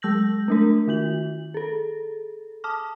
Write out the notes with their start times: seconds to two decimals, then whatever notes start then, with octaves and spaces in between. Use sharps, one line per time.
0.02 F#3 G#3 E6 G6 A#6 F#7
0.48 A3 D4 A#4
0.88 D#3 F#4 F#7
1.54 G#4 A4
2.64 A5 D6 D#6 F6